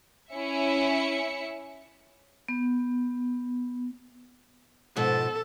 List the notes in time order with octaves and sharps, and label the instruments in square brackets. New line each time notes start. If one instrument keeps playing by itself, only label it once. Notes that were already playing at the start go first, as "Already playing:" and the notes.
[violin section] C#4 E4 E5 C#7
[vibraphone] B3
[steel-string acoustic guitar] G#2 B2 F3 [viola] A4